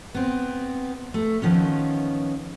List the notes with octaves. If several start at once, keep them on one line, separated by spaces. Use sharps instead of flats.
B3 C4
A3
D#3 F3 B3 C#4